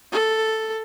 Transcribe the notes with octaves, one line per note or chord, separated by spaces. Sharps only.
A4